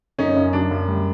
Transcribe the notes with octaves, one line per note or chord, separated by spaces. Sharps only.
F#2 C#4 D#4
F#2
F#3 D4
F#2
G3